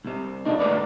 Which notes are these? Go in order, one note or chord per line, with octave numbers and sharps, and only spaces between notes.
C2 C3
C3 D4 D#4
D2 G#2 A#4 B4 D5